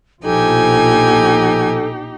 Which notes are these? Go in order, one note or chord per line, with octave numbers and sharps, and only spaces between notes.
A#1 B2 F3 D#4 G4 A4 G#5